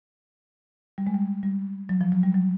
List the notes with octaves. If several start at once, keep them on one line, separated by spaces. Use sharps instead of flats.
G3
G#3
G3
G3
F#3
F3
F#3
G3
F#3